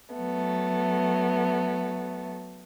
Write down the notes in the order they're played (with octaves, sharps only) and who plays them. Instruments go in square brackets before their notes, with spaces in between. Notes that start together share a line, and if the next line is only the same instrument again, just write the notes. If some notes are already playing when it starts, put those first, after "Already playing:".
[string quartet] F#3 A3 B3